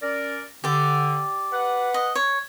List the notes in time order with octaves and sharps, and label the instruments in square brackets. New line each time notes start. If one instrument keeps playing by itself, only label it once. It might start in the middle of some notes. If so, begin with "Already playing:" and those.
[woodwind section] C#4 A#4 D5
[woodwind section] D3 [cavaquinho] G4 D5
[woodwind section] B4 F#5
[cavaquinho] D#5
C#5